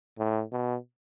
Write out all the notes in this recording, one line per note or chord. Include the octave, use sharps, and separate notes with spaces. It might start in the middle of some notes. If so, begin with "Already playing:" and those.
A2
B2